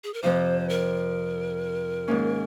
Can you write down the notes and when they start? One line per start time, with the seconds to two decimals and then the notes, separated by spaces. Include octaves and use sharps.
0.04 G#4
0.14 A#4
0.22 F2 C3 F3 C4 F4 C5
0.69 A#4
2.08 G#2 D#3 A#3 C#4